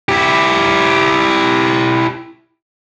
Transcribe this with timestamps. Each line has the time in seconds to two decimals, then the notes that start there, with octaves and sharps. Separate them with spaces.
0.09 E4 G4